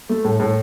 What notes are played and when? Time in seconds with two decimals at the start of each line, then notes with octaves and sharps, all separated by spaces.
0.09 A3
0.25 A2
0.40 A2